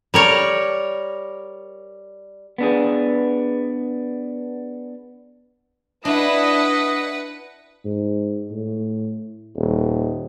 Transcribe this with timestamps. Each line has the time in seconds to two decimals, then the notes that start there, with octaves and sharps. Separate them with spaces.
0.14 G3 A#4 C#5
2.58 B3 D4 G#4
6.05 D4 E4 B4 D#5 F#5
7.85 G#2
8.51 A2
9.56 D#1